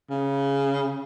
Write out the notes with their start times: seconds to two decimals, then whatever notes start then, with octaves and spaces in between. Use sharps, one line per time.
0.10 C#3